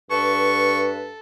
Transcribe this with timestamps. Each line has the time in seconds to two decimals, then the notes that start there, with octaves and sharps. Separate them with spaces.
0.11 G2 A4 B4 C#6